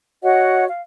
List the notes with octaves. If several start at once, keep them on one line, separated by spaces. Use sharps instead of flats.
F#4 C#5 D#5 F#5
F5